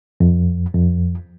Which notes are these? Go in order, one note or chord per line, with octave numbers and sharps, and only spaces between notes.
F2
F2